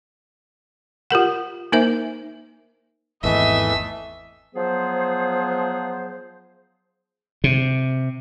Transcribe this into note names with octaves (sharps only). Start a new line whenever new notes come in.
F4 G4 A#4 F#5
A#3 D#4 A#4 C5 E5
G#1 E2 E3 A3 D#5 E5
F3 F#3 B3 G#4 C5
C3